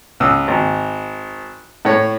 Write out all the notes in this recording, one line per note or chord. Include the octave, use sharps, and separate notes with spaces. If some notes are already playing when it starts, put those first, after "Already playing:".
C#2 D#6 E6
G#1
A2 C#5